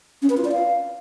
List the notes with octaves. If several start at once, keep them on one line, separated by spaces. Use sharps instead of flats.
C#4
B4
F4
D5
F5